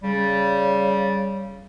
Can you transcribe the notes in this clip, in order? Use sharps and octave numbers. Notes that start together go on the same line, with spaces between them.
C#3 G3